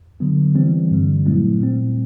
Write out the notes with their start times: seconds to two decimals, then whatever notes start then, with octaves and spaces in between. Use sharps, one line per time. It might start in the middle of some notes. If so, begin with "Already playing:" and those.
0.20 D3 F#3 B3
0.55 E3 G3 C4
0.91 G2 D3 G3
1.26 A#2 F#3 A3 C4 E4
1.61 A#2 G3 C4